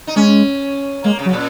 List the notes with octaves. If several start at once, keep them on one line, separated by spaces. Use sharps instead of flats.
D#4
G#3 C#4
G#3 A#3
C#3
F#3
C#3
A#2